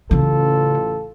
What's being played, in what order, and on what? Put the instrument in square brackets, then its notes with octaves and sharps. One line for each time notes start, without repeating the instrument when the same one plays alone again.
[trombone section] A1 F4 A4 [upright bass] C#3 E3